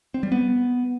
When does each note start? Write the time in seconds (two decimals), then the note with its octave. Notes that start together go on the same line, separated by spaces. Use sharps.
0.14 C4
0.23 G3
0.32 B3